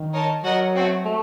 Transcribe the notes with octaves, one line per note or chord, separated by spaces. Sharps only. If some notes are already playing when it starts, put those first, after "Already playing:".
Already playing: D#3
D#4 A#4 C#5 A5
F#3 F#4 A#4 D#5 F#5
A3 C4 F#4
A3